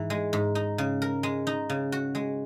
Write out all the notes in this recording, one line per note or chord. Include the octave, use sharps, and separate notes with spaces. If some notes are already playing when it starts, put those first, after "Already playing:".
Already playing: G#2 E3
G#3
G#2
D#4
C#3
A#4
G#3
D#4
C#3
F#4
G#3